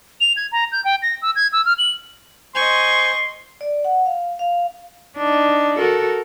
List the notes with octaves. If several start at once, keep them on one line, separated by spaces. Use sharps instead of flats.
F7
G#6
A#5
G6
G5
A#6
E6
G#6
E6
F6
F#7
C5 D#5 G#5 C6 C#6
D5
F#5
F5
F5
D4 D#4
F#4 A4 A#4